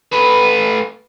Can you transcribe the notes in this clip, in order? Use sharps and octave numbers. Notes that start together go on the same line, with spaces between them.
A3 B4